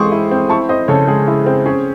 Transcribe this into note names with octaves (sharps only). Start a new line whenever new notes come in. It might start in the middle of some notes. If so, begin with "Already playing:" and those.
Already playing: E3 G#3 C4 C6 C#6 D#6
E4
C4
E4 A5 C#6
C4 C5 D#5
C#3 A4 C#5
G#3 G#4
E4
C4
C#4 G#4